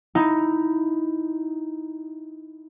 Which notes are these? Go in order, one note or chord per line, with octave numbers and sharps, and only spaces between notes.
D#4 E4